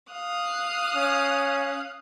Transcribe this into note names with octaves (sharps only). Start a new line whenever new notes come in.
F5 D#6 F#6
C#4